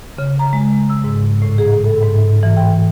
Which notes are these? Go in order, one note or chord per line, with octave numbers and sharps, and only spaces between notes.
C#3
A#5
G#3
E6
G#2
A2
G#4
A4
G#2
E3
G5